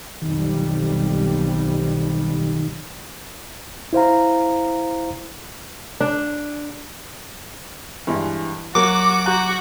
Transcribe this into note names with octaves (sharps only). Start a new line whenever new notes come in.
B1 F2 D#3 G3
E4 C5 F5 A#5
D4
G2 E3 G#3
F#3 A#3 F#4 D6
F#4 A#5 F#6 G6